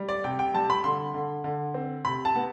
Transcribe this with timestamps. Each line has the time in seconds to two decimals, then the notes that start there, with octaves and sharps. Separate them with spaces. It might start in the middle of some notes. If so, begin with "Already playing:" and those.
Already playing: G3
0.09 D5
0.24 C3 G5
0.39 G5
0.54 G3 A5
0.70 B5
0.84 D3 C6
1.14 D3
1.44 D3
1.74 C4
2.05 C3 B5
2.25 A5
2.35 B3